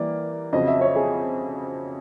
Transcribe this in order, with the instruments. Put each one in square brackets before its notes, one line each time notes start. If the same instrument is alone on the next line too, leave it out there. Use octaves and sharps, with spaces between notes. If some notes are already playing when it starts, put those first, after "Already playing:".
Already playing: [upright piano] E3 G3 A#3 [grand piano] D5
[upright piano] F2 C#3 F#3 [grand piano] D#5
[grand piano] E5
C#5
G#4